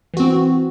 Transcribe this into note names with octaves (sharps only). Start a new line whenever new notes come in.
E3 C4 F#4